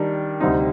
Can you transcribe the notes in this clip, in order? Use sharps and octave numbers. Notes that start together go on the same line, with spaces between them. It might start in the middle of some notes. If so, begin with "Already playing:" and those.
Already playing: D#3 G3 D4
D2 C3 G3 C4 D#4